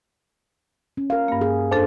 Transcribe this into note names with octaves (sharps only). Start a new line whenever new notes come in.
C#4
A#4 F5
G2 A#3
G#4
F2 D4 A4 C5